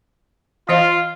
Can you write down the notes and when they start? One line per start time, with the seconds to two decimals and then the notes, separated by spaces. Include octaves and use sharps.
0.69 E3 F4 C5 D#5